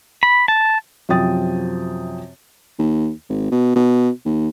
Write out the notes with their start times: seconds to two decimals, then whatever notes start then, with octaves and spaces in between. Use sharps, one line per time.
0.23 B5
0.48 A5
1.09 F#2 C3 F3 G5 D#6 A6
2.79 D#2
3.29 G#1
3.51 B2
3.75 B2
4.26 D#2